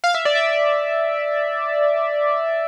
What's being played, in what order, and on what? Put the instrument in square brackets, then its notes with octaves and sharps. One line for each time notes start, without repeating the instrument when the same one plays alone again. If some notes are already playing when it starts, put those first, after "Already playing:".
[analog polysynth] F5
E5
D5
E5